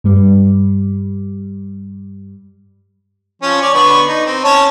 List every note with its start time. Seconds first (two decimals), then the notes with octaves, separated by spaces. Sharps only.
0.04 G2 G3
3.42 F3 C#4
3.62 C#5 D5
3.74 D3 B3 C#6
4.07 D#4
4.26 C4
4.44 C#4 C#5 A5